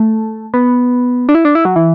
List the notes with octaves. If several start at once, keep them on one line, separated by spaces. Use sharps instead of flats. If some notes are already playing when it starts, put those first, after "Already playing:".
Already playing: A3
B3
D4
E4
D4
E4
F#3
E3